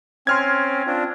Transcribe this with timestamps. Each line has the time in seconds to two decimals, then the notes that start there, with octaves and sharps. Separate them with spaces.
0.27 C4 C#4 C6 F6 G#6
0.87 C4 D4 F4